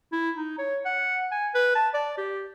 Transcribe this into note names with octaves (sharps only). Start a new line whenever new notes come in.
E4
D#4
C#5
F#5
G#5
B4
A5
D5
G4